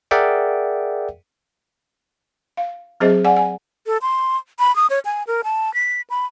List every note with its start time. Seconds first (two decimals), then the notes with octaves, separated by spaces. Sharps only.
0.11 G#4 A#4 D5 E5 F#5 G5
2.57 F5
3.00 F#3 C4 G#4 C5 D#5
3.24 D5 F#5 G#5
3.37 G#5
3.86 A4
4.02 C6
4.59 B5
4.76 D#6
4.90 C#5
5.05 G#5
5.27 A#4
5.44 A5
5.74 B6
6.10 B5